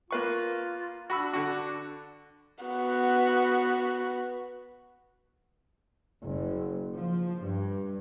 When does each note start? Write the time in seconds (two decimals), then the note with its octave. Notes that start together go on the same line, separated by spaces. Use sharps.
0.11 A#3 F4 B4 C#6
1.10 D4 F#4 B5 E6
1.33 D3 F#4
2.64 B3 F#4
6.22 F#1
6.97 F3
7.43 G2